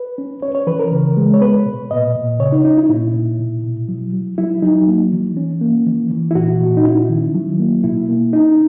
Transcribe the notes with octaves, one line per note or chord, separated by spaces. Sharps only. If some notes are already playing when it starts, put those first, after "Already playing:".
Already playing: B4
C#4
C#4 C#5
C#5
E3 B4
A#4
C#3
G#3
C#5
B3 B4
B2
A#2 D#5
A#2
C#3 C#5
D#4
C#4 D#4
E4
A#2 E4
A#2
B2
B2
F#3
F#3
F#3 E4
F#3 D#4
A#3
E3
C#4
A#3
E3
E3
E4
A#2 F#4
A#2
D#4
C#4 E4
D#3
F#3
A#3
B2 E4
A#3
C#4 D#4